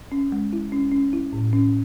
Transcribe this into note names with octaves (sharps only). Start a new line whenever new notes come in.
C#4
G#3
E4
C#4
C#4
E4
A2
C#4